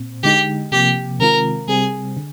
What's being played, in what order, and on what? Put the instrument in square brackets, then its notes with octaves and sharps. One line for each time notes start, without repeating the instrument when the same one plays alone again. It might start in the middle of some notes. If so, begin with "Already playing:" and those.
Already playing: [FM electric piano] A#2 C4
[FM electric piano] D3 G#3 D#4 [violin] G4
[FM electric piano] C3 F3 A#3 [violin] G4
[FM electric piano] C3 D#3 G#3 C4 F4 [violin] A#4
[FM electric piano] C3 G3 C4 [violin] G#4
[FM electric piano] D3